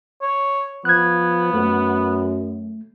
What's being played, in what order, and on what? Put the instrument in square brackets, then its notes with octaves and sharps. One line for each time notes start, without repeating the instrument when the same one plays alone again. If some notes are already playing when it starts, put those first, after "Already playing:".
[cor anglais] C#5
[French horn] F3 [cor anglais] B3 [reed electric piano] F#6 G#6
[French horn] F#2 [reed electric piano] A3